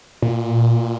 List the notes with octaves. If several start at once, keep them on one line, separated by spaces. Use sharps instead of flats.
A#2